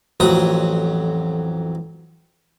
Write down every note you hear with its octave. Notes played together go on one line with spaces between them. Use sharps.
A1 F2 F#3 D#6